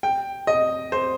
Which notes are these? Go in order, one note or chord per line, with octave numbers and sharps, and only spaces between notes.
G5
D#5
C5